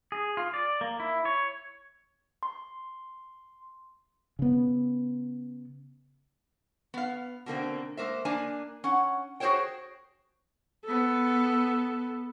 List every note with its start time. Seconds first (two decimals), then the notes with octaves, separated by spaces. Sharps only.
0.12 G#4
0.37 F4
0.54 D5
0.81 A#3
1.00 E4
1.25 C#5
2.43 C6
4.39 C#3 B3
6.94 B3 F5
7.46 B2 D3 A#3 C4
7.97 G#3 A#3 C5 E5
8.25 A#3 D4 G#5
8.84 C#4 F#5
9.40 F#4 G#4 A4 C5 C#5 G5
10.85 B3 A4